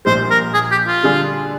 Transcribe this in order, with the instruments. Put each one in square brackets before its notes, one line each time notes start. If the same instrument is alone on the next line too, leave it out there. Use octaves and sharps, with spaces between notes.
[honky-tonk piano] A#1 A#2 G3 [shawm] C5
[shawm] A#4
G#4
G4
F4
[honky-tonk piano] D3 G3 D4 G#4